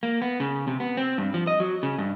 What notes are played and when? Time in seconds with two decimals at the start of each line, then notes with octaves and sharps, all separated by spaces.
0.03 A#3
0.22 B3
0.40 C#3
0.68 C3
0.80 B3
0.97 C4
1.18 G2
1.34 F3
1.47 D#5
1.60 F#3
1.83 C#3
1.98 G2